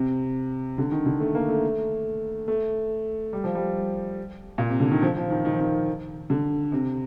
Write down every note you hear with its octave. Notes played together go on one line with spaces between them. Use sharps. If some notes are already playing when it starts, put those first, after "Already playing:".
Already playing: C3
D3
D#3
D3
A3
A#3
A3
A3
G3
F3
G3
A#2
C3
D3
D#3
F3
F3
D#3
D#3
F3
D#3
D3
C3